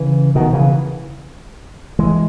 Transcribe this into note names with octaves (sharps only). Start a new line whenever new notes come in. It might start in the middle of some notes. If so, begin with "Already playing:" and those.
Already playing: C#3 E3
B2 D#3
C#3 E3
E3 G#3